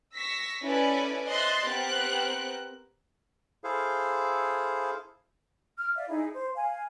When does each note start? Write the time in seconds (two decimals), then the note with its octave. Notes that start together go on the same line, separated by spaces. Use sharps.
0.13 C#6 E6 A#6 B6
0.62 C#4 E4 A4 B4 D5 G#5
1.27 C5 D#5 E5 C6 F#6 A6
1.66 B3 C4 G4 A#4 F#6
3.64 E4 G#4 A4 C5 F5
5.77 F6
5.96 D5 E5 F5
6.09 D#4 E4 G#4
6.33 C5
6.55 F5 G#5